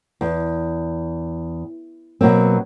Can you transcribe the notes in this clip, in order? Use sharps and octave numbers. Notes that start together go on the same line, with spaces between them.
E2
B2 F#3 A#3 C4